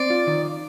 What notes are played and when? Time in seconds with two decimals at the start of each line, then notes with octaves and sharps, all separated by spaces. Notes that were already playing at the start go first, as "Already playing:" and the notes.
Already playing: C4 D5
0.10 F4
0.27 D#3